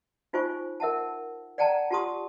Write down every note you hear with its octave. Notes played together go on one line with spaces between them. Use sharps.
D#4 F4 C5 G#5 C#6
A#4 E5 F#5 A5
D5 F#5 G5 A5 A#5
F4 G4 A5 C6 C#6 D#6